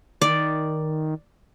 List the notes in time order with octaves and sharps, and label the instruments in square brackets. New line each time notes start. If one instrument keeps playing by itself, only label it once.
[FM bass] D#3 [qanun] D5